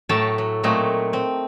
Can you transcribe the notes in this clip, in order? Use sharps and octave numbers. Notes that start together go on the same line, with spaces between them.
A2 F#3 A4 E5 G5 A5
F#3
A#2 F#3 A3 C4 D#4
C4